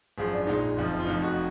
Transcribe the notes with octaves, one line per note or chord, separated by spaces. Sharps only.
G#1 F#2 F3 G#4
D4
A#1 A#2 G#3 D#4
F#1 F2 F3
F4
F1 F2 F3 D#4
F#4